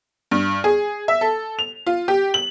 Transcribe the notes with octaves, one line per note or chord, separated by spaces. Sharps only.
G2
G#4
E5
A4
F7
F4
G4
F#7